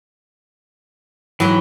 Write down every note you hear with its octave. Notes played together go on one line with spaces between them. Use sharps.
G#2 E3 F#3